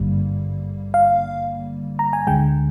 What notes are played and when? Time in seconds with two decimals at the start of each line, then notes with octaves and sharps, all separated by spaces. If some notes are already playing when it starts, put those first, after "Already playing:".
Already playing: G#1 G2 D3 G3 A#3
0.94 F5
1.99 A#5
2.13 G#5
2.27 D2 D3 G#3 G5